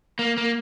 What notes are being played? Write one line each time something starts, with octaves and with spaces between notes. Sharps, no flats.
A#3
A#3